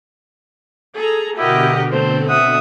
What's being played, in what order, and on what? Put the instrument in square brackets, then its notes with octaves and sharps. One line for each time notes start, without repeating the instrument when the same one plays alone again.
[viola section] G#4 A4 A#5
[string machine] B2 D3 [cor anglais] E4 [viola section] F#4 G4 A#4 [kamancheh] D#5 F#5
[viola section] A3 C4 [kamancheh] A4 [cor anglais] C5
[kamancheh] E5 D#6 [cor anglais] F#5